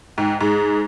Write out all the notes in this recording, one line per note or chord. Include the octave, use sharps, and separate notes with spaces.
G#2 G5
G#2 G#4